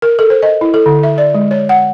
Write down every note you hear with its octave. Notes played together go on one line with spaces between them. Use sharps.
A#4
A4
C5
D#5
E4
A4
D3
E5
D5
G#3
C#5
F#5